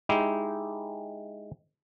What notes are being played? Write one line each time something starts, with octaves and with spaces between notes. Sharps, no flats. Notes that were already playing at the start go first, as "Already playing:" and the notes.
G#3 D#4 E4 G4